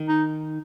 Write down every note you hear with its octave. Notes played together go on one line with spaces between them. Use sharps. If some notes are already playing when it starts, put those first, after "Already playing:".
Already playing: D#3
D#4